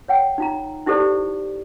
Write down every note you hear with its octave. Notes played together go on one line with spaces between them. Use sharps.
C#5 F#5 G5
D#4 F4 A#5
D#4 E4 G4 A4 C5 D5